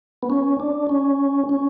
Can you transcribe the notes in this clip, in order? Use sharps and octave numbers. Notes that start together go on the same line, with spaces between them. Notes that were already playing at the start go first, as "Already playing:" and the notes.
B3
C#4
D4
C#4
C#4